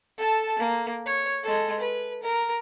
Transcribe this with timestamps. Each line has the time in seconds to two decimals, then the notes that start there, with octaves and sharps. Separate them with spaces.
0.18 A4 A5
0.59 A#3
1.06 C#5
1.43 G#3 A4
1.80 B4
2.23 A#4